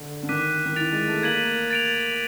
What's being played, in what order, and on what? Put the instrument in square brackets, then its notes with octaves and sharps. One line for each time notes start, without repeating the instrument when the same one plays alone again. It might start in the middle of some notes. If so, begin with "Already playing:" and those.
Already playing: [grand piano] D3
D3
[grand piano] D#3 [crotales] D6 F#6 B6 D#7
[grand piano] D#3
[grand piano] E3 [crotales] A6 D7 F7
[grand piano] G#3
A3
[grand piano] A#3 [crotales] G#6 B6 D#7 F#7
[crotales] A6 D7 F7